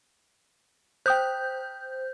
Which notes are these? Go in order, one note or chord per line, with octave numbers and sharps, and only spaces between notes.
C5 G5 D#6 F#6 G6